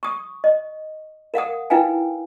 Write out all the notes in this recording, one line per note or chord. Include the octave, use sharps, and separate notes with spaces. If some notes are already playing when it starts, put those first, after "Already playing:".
C#6 D#6
D#5
A#4 F5 F#5 D#6
D#4 E4 B4 F5 G5 G#5